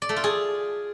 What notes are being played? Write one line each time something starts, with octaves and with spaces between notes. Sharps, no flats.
D5
A3
F4
G#4